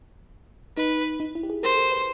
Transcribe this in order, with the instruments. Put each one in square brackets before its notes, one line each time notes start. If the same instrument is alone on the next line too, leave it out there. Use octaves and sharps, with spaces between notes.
[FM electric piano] D#4 [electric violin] B4
[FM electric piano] D#4
E4
G4
G#4
[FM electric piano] A#4 [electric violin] C5
[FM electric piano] A4
A#4
B4